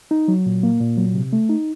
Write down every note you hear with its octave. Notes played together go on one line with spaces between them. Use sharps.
D#4
F#3
A#2
A#3
A#2
F#3
C3
A3
D#4